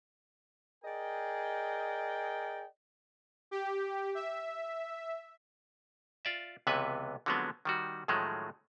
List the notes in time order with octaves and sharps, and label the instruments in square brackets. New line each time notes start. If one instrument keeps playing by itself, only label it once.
[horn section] G#4 A#4 D5 D#5 G5
[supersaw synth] G4
E5
[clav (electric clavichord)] F4 D5 E5
C#2 C3 E3 B3 B4 G#5
D3 F3 F#3 G#3 B3 C4
D#3 G3 F#4
A2 D#3 F3 F#3 G#3 A3